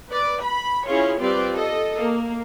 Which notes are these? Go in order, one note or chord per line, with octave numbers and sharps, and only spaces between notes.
B4 D5
B5
C#4 E4 F4 G#4 C#5
G3 C4 F4 G4 B4 D5
A4 D#5
A#3